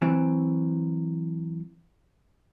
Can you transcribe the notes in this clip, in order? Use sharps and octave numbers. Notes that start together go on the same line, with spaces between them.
E3 F#3 C4